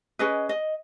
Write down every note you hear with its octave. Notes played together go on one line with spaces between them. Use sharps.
C#4 G#4 B4 D#5
D#5